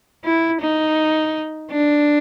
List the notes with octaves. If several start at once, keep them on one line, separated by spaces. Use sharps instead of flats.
E4
D#4
D4